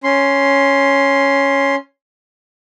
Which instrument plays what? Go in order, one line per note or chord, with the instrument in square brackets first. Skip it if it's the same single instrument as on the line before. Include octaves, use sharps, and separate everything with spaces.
[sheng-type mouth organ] C#4 C6